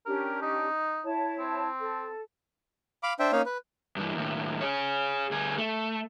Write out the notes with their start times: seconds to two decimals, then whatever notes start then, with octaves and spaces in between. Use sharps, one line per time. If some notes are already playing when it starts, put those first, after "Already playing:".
0.06 C#4 D4 G4 A#4
0.42 D#4
1.03 E4 C#5 A5
1.39 C4
1.80 A4
3.03 F5 B5 D6
3.19 D4 C5 E5 G5
3.32 A#3 C#4 D#4 C#5 F5
3.46 B4
3.96 G2 E3
4.15 D#2 A2
4.61 G#4 C#5
5.31 D2 G#4
5.58 A3